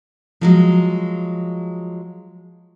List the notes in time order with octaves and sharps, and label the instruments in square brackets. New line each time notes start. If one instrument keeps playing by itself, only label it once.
[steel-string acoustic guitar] F3 F#3 G#3